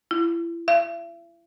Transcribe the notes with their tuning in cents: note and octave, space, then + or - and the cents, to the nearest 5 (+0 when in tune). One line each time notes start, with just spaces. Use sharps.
E4 +35
E5 +45